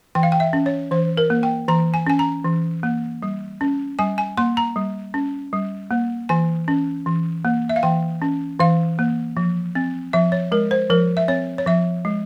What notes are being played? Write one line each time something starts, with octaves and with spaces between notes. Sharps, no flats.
E3 G5
F5
G5
E5
C#4
C#5
E3 C5
A#4
A#3
G5
E3 A#5
G#5
C#4 G#5
A#5
E3
A#3
G3
C#4
G3 G#5
G#5
A#3 C6
A#5
G3
C#4
G3
A#3
E3 G#5
C#4
E3
A#3
E5
F5
E3 G5
C#4
E3 F5
A#3
F3
C4
F3 E5
C#5
G#3 A#4
C5
F3 A#4
E5
C4 C#5
C#5
F3 E5
G#3